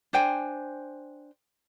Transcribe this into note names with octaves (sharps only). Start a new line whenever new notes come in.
D4 C5 G5 G#5